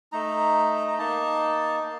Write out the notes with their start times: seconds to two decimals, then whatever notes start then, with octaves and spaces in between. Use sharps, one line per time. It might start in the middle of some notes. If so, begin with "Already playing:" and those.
0.12 A3 D#4 A#5
0.87 A#5
0.99 A#3 D#4 A5
1.83 A#3